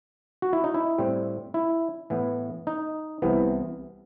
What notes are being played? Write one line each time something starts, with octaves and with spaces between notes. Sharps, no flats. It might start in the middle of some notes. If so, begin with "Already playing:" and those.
F#4
E4
D#4
E4
A2 G3 C4
E4
A2 E3 B3
D#4
C2 C3 E3 B3